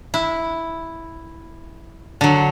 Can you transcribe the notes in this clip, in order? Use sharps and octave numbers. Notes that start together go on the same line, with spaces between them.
E4
D3 F#3